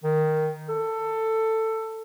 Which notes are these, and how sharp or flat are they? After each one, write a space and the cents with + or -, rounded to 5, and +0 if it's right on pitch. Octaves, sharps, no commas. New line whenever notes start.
D#3 +0
A4 +15